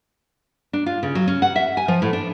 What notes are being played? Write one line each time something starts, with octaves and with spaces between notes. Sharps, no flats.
D4
F4
C#3
F#3
C#4
F#5
E5
G#5
F3
A2
D4